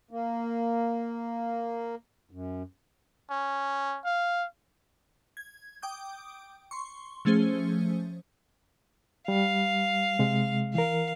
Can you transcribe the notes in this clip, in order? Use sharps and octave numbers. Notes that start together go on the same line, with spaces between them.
A#3
F#2
C#4
F5
G#6
G5 D6 D#6 G6
C6 C#6
F3 A3 C#4 G#4 C5
G3 F5
C3 G#3
E3 A#4 F5